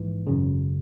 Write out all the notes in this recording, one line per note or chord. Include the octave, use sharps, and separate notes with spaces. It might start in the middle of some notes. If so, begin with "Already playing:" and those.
Already playing: A#1 G#2 E3
G#1 F#2 C#3